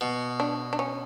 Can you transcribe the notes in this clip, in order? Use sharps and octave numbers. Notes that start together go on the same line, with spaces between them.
B2
D4
D4
C#4